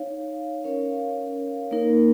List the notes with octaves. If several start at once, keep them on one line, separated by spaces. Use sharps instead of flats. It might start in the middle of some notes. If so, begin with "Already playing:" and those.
Already playing: D#4 C#5 F5
C#4 A#4 C#5 F5
A#3 D#4 A#4